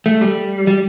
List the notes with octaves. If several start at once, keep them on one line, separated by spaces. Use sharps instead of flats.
A3
G3
G3